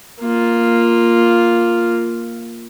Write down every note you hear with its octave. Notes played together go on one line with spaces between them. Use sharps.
A#3 F4